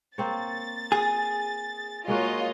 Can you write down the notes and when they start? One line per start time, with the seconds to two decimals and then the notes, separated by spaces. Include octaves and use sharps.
0.18 A#3 C4 C#5 A6
0.92 G#4
2.08 G#3 A#3 F4 F#4 C#5 D#5